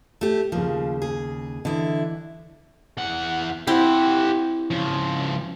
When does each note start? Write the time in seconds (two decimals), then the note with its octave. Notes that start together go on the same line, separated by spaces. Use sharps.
0.21 A3 G4
0.52 D#2 C#3 F3
1.02 G#4
1.65 D3 E3 D4 E4 D#5
2.97 E2 F#5
3.67 C4 E4 G4 F#5
4.71 C#3 F3